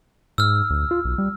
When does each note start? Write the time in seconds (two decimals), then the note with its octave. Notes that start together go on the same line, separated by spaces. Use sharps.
0.38 G#2 E6 F6
0.70 D2
0.91 F4
1.05 B1
1.18 G3